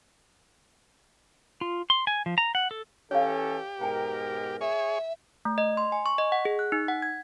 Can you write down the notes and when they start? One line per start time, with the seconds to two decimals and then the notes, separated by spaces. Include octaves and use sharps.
1.61 F4
1.90 C6
2.07 G#5
2.26 F3
2.38 A#5
2.55 F#5
2.71 A4
3.11 E3 C#4 G4 A4 C#5 F5
3.81 G#2 B2 A#4 G5 G#5
4.61 G#4 C#5 E5
5.45 A3
5.58 D#5
5.77 C6
5.92 G#5
6.06 C#6
6.18 D#5
6.32 F#5
6.45 G#4
6.59 F#6
6.72 D#4
6.88 F#5
7.02 G#6